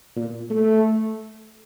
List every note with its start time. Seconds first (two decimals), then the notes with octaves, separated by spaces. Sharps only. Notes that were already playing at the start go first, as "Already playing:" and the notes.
0.16 A#2
0.50 A3